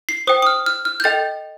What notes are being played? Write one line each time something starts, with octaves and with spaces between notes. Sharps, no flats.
C7
C5 G5 D#6
D#6
F6
F6
F6
G6
A4 D#5 G5 A6